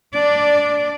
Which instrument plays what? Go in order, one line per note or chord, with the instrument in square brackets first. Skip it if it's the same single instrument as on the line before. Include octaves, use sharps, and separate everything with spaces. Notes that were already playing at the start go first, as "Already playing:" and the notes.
[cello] D4 D5